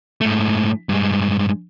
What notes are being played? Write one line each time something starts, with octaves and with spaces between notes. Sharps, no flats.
G#2 A3
G2 G#3